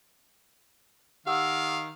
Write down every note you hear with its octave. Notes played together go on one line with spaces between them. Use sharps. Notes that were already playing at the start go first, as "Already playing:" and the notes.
D#3 G4 F5 F#5 E6